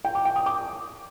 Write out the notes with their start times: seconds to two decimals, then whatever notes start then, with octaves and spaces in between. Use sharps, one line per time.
0.05 G5
0.15 D6
0.25 G5
0.36 D#6
0.46 D6